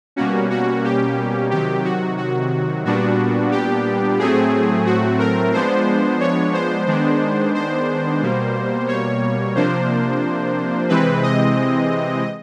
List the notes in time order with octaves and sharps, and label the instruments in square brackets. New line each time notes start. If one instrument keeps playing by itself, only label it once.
[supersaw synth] B2 G3 A#3 C#4 F#4
F#4
G4
C3 D#3 F#3 G4
F#4
F#4
A#2 G3 B3 D4 F#4
G4
A2 F#3 A3 C4 G#4
F#4
A#4
F3 G#3 B3 D4 C5
C#5
C5
D#3 G#3 B3 D4
C5
B2 G3 A#3
C#5
C3 F3 A#3 D4 C5
C3 E3 G#3 C4 B4
D#5